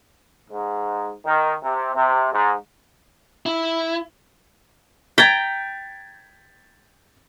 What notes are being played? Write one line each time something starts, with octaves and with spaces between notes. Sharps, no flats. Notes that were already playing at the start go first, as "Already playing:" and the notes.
G#2
D#3
C3
C3
G#2
E4
G5 A#5 G#6 A6 B6